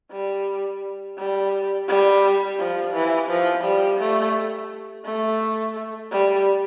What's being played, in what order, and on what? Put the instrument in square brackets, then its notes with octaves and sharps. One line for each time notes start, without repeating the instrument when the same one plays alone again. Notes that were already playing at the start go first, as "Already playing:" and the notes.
[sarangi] G3
G3
G3
F3
E3
F3
G3
A3
A3
G3